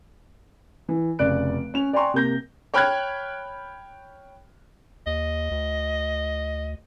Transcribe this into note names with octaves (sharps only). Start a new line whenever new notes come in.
E3
F1 C#3 D5 F#6 D7
C#4 F7
D5 G5 G#5 A#5 C6 C#6
C3 A#3 G6 A#6
C#5 G5 B5 F6 F#6 G#6
D#2 D#5
D2